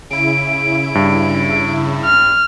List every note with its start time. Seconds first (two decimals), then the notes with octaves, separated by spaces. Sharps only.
0.10 C#3 E4 D7
0.95 G2
2.05 F6